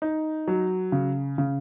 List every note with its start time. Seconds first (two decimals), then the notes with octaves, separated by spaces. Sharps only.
0.02 D#4
0.48 F#3
0.92 C#3
1.38 C#3